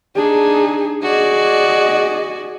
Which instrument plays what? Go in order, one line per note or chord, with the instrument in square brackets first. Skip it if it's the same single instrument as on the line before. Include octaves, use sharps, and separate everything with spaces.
[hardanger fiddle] D4 D#4 [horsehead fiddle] G#4
[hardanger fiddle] F#4 D5 [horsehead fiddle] G#4 D#5